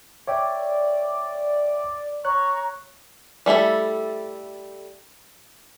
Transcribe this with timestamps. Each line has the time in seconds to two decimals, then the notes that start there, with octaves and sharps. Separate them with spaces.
0.27 C#5 D5 E5 G5
2.25 C#5 A#5 C#6 F#6
3.46 G3 A3 E4 A4